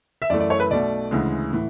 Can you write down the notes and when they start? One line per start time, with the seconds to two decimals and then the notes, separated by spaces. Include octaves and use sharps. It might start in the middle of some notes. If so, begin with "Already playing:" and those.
0.22 E5
0.30 F#2 E3 A3 D5
0.40 D5
0.50 C#5
0.60 B4
0.70 B1 B2 A3 D5
1.11 D2 C#3 E3 G#3
1.53 A2 E3